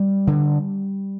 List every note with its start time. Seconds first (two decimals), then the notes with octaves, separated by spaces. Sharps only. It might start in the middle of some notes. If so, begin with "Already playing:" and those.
Already playing: G3
0.27 D3